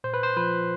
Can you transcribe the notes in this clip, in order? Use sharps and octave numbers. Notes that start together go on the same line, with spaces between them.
A#2 C5
B4
C5
F3 B4